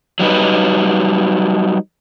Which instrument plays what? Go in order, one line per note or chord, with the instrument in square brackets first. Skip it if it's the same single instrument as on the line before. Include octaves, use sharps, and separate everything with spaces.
[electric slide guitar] F#3 G3 D#4 B4